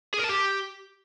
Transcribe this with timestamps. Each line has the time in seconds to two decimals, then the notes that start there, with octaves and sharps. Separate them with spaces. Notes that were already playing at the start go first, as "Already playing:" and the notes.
0.14 G#4
0.19 A#4
0.24 A5
0.29 G4